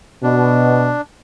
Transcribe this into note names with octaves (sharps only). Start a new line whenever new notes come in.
B2 D4